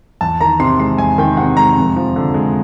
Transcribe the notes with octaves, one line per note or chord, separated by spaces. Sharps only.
E2 A5
D#3 A#5
C3 C6
G#3 C6
E2 G#5
D#3 G5
C3 F#5
G#3 A#5
F2
F3
D3
G#3